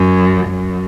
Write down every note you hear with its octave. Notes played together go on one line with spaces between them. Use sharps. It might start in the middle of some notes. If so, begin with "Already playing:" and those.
Already playing: F#2
F#2